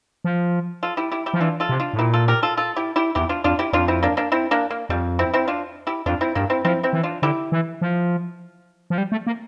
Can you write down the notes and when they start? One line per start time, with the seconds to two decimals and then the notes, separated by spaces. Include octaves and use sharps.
0.24 F3
0.83 F4 A4
0.97 E4 G4
1.11 E4 G4
1.26 E4 G4
1.34 F3
1.40 E3 D4 F4
1.60 F4 A4
1.69 C3
1.80 D4 F4
1.94 A2
1.99 A#2 E4 G4
2.13 F4 A4
2.28 G4 A#4
2.43 F4 A4
2.57 F4 A4
2.76 E4 G4
2.96 E4 G4
3.15 E2 E4 G4
3.29 D4 F4
3.44 F2 D4 F4
3.59 E4 G4
3.73 F2 D4 F4
3.88 C4 E4
4.03 A#3 D4
4.17 A#3 D4
4.32 C4 E4
4.51 A#3 D4
4.70 A#3
4.89 F2 G3
5.19 C4 E4
5.34 C4 E4
5.48 D4 F4
5.87 E4 G4
6.06 F2 D4 F4
6.21 C4 E4
6.35 G2 A#3 D4
6.50 C4 E4
6.65 F3 C4 E4
6.83 C4 E4
6.93 E3
7.03 D4 F4
7.22 D3 E4 G4
7.52 E3
7.81 F3
8.90 F3
8.98 G3
9.12 A3
9.27 A#3